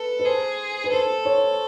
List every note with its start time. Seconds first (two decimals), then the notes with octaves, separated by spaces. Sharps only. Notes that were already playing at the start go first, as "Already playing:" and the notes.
Already playing: A4 B4
0.19 B4
0.25 G#4 C5
0.84 B4
0.92 A4 C5
1.25 C#5